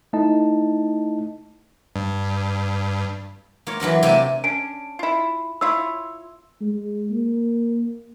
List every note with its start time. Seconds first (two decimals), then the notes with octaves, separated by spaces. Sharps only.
0.13 A3 D#4 E4 D#5 A5
1.96 G2
3.67 A#3 F4 C#5
3.80 E3 F#3 D4 A#4
4.03 C3 A#3 G#5 A5
4.44 C#4 D4 D7
4.99 E4 F4
5.61 E4 F4 C#5 E6
6.61 G#3
7.11 A#3